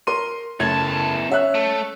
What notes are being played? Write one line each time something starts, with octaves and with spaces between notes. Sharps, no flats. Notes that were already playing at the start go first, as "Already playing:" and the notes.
A#4 C6 D#7
F#1 E2 A3 A5 G#6
C#4 E5 F#6
A3